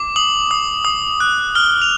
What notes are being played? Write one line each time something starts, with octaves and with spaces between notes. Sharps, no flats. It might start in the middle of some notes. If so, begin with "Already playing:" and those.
Already playing: D6
D#6 F#7
D#6
D#6
F#6
F6 G7
F7